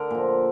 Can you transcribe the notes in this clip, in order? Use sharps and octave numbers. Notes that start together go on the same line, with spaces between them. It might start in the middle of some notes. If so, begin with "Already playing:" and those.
Already playing: D3 A#4
A#2 F3